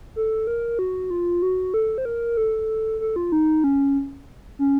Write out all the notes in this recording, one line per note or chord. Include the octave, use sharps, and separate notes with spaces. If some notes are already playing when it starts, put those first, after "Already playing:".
A4
A#4
F#4
F4
F#4
A4
C5
A#4
A4
A4
F4
D#4
C#4
C#4